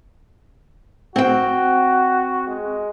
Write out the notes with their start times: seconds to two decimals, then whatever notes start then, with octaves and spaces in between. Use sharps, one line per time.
1.16 C4 F#4 G5
2.47 G#3